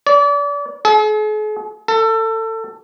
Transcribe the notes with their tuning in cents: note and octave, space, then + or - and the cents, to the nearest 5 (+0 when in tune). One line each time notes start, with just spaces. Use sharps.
D5 -35
G#4 +45
A4 +25